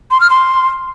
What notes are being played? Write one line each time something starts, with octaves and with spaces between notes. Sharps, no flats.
C6
F6
C6